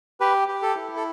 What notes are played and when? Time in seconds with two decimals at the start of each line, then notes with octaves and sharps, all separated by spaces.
0.20 G4 B4
0.48 G4
0.62 A4
0.76 E4
0.96 A4